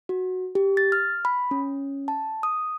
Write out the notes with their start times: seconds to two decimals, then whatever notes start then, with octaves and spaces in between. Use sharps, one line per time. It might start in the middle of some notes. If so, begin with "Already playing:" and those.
0.09 F#4
0.55 G4
0.77 A6
0.92 F6
1.25 B5
1.51 C#4
2.08 A5
2.43 D#6